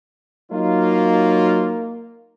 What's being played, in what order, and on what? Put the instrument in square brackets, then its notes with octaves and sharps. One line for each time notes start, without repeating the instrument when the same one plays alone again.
[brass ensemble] F#3 D#4 F4 [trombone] A#3